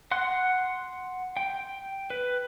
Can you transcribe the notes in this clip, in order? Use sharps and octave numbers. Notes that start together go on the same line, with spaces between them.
F#5 C6 F#6
G5
B4